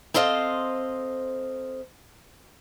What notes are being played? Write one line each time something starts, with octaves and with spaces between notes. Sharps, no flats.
C4 A4 C5 D#5 F5